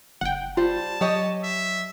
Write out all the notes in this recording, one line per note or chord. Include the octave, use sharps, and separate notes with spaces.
F#1 F#5 G5
G3 F4 C5 A5
F#3 G4 C#5 D#5
E5